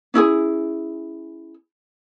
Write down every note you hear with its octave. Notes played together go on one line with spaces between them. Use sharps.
C#4 E4 G4 G#4